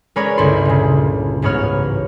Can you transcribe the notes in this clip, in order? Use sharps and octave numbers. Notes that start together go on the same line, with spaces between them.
G#3 C#4 A#4 B4 C#5 D5
G1 C#2 D3 E4 A4 C6
A#2 C#3
A1 G#2 B3 C#5 F6